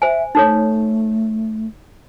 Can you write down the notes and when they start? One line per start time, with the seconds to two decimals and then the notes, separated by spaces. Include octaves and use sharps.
0.02 C5 E5 G#5
0.35 A3 D#4 A4 C#5